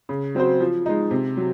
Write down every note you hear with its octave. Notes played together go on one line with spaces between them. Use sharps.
C#3
F#3 C4 F#4 C5
F3
G#3 D#4
C3
F#3